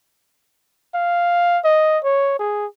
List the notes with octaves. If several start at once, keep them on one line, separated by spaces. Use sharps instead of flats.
F5
D#5
C#5
G#4